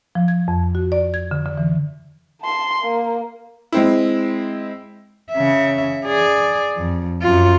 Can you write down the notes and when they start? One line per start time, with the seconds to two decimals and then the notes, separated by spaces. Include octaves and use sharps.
0.15 F3
0.28 G#6
0.48 F2
0.75 F#4
0.92 D5
1.14 G#6
1.31 D3
1.46 D3
1.58 E3
2.42 A5 C6
2.82 A#3
3.72 G#3 C4 E4
5.32 C#3 E5
6.05 G#4 D5
6.77 F2
7.22 F#2 F4